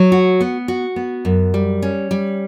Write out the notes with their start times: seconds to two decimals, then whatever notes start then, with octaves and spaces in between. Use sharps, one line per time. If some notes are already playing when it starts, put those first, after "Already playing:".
Already playing: F#3
0.12 F#4
0.41 B3
0.68 F#4
0.96 B3
1.25 F#2
1.54 G3
1.82 C#4
2.11 G3